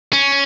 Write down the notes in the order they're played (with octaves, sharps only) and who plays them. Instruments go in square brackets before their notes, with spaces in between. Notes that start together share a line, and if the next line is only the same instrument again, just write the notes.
[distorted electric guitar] C#4